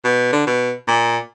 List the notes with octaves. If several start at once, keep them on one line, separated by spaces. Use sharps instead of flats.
B2
D3
B2
A#2